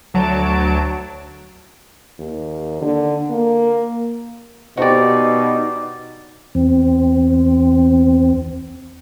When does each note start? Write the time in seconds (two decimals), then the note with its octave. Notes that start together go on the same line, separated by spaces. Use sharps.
0.14 D2 F#3 A5 D7
2.19 D#2
2.82 D3
3.30 A#3
4.77 B2 D#4 F#4 G4 C5 D5
6.55 E2 C4